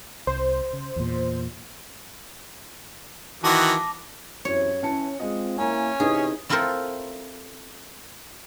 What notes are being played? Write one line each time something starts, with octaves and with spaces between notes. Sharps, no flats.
C2 C5
C#3
E2 A#2
D#3 E3 F#4 A5 D6 A#6
F#2 C3 E3 C#5
E3 C#4 A5 C#7
G#3 C4 F4 D#5
A#3 C#4 E4 G#5 A#5
C3 E3 D#4 G#4 B4
C4 E4 F4 A4 A#4 C5